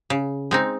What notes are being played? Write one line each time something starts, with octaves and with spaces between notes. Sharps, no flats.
C#3
G#3 C4 D#4